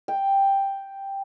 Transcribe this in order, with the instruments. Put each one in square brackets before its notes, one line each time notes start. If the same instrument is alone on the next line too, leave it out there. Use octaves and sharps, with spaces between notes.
[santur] G5